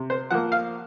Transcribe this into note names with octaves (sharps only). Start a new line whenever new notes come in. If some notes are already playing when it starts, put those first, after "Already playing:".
Already playing: C3
C5
F3 A#3 F#5
F5